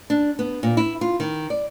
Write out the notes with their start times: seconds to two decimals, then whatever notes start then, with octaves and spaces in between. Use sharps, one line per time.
0.10 D4
0.39 B3
0.63 A#2
0.77 E4
1.01 F4
1.20 D#3
1.50 D5